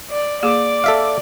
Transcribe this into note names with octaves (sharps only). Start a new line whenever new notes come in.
D5
A#3 G#4 D5 D6
A4 E5 F5